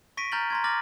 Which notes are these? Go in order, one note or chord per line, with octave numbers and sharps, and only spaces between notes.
C#6 A#6 B6 D7 D#7
A#5 F6 G6 A6 F#7 G7
A#5 C6 G#6
D6 F6 A6 A#6 F#7